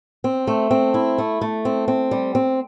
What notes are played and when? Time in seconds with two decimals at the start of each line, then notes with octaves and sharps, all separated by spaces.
0.24 C4
0.47 A3
0.71 C4
0.94 E4
1.18 A3
1.41 A3
1.65 C4
1.88 C4
2.11 G3
2.35 C4